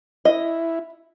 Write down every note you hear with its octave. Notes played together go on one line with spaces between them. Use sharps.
E4 D#5